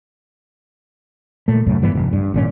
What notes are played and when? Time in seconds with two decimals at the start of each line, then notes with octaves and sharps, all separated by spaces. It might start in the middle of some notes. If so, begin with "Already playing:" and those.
1.48 A#2 A3
1.66 C2 F#2 A2
1.82 G2 E3 B3
1.95 F1
2.13 G2
2.34 G#1 A#2 C#4